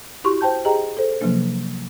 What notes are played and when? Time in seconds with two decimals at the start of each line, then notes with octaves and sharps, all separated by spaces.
0.24 E4 F#4 G4 C6 C#6
0.41 C5 G5 A5 G6
0.65 G4 G#4 D#5 G5 A#5
0.97 A4 C5
1.21 C3 F3 F#3 A#3 D4